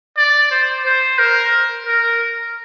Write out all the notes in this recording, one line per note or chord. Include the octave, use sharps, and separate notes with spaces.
D5
C5
C5
A#4
A#4